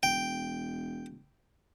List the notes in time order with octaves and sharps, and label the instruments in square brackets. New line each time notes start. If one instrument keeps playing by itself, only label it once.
[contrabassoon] E1 [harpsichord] G5